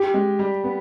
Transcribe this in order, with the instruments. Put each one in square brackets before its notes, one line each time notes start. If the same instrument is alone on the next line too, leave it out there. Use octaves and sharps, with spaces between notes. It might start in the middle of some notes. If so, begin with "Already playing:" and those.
Already playing: [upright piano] G4
[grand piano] G#3
G3
B3